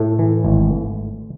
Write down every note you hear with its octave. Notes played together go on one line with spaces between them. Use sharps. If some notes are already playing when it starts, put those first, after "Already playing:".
Already playing: A2 A3
E3
G#1